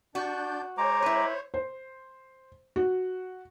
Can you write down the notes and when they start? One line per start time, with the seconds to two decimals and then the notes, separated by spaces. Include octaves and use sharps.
0.15 D4 F#4 D5 G6
0.78 G#3 C5 C#5 A#5 D6
1.02 E4 B4
1.54 C5
2.76 F#4